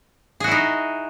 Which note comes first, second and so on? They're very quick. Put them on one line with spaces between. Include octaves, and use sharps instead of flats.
G#4 F#4 E4 D#4